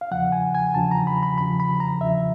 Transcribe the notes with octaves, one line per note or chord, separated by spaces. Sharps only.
F5
E2 C#3 F3 F#5
G#5
G#5
E2 C#3 F3 A5
A#5
B5
B5
E2 C#3 F3 B5
B5
A#5
E2 C#3 F3 E5